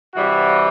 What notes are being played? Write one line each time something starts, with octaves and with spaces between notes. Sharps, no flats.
C3 E3 G3 F#4